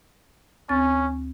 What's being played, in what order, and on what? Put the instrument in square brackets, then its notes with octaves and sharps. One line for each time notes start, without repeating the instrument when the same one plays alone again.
[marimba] D2 C4 A6 [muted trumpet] C#4